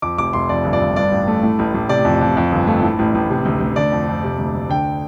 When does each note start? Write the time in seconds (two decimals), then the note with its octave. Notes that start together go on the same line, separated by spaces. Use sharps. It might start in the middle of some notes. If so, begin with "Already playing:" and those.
0.02 F2 D6
0.18 F1 D6
0.33 F1 C6
0.49 F2 D5
0.64 G1
0.73 D5
0.81 G1
0.96 G2 D5
1.11 A1
1.27 A3
1.43 A2
1.59 A1
1.74 A1
1.89 C3 D5
2.05 F2
2.21 F2
2.37 F2
2.52 G1
2.67 A3
2.82 A2
2.99 A1
3.15 A1
3.30 C3
3.45 D2
3.61 D2
3.76 D3 D5
3.92 F2
4.08 F2
4.23 C3
4.38 D2
4.55 D2
4.69 D3 G5